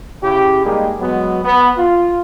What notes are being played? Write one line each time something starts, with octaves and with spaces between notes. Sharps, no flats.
C#3 E4 G4
G3 G#3 A#3 D#4 G4 G#4
F#3 G#3 B3
B3
F4